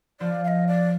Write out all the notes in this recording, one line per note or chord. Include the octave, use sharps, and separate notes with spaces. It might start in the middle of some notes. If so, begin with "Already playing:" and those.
F3 F4 D5
F5
D#5
D5